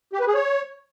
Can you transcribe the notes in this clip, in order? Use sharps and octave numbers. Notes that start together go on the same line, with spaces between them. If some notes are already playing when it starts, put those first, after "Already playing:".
G4
B4
G#4
C#5